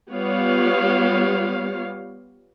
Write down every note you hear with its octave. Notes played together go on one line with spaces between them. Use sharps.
G3 B3 F4 G4 C#5 F5